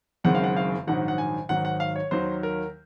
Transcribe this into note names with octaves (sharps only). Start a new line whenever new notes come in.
F#1 F#2 D#3 G#3 C4 F#5
F5
F#5
F5
A#1 G#2 D#3 F#3 F#5
F#5
G#5
G#1 G#2 D#3 F#3 F#5
F#5
F5
C#5
D#2 D#3 F#3 C5
A#4